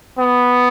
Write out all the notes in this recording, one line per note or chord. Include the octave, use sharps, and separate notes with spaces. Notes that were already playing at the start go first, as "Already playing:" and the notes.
B3